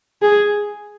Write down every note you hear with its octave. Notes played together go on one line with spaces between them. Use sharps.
G#4